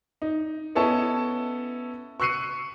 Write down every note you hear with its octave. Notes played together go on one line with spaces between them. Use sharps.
D#4
B3 C#4 E4 A4 D#5 A5
C#6 E6 F#6 C7 C#7 D#7